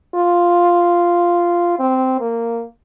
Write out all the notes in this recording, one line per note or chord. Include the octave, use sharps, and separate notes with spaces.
F4
C4
A#3